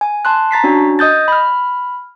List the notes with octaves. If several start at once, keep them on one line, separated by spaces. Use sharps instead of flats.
G#5
A5 C6 F#6
A#5 A6 B6 C7
C#4 D4 F#4
D#5 D#6 G6 A6
B5 F6